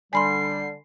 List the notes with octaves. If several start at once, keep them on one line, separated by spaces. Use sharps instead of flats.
D3 G3 G#5 B5 C6 C7